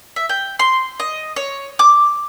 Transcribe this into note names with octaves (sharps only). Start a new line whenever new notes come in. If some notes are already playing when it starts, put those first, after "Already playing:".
E5
G5
C6
D#5
C#5
D6